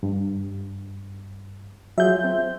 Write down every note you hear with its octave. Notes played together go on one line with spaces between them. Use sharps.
G2
F#3 F4 G#4 E5 G6
C4